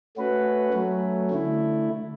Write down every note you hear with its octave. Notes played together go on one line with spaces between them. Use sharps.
A3 C#4 F#4 B4
F#3 A3 C#4
D3 A3 E4